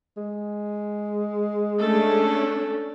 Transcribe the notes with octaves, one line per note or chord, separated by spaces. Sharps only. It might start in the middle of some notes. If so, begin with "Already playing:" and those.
G#3
A3 C#4 D4 A4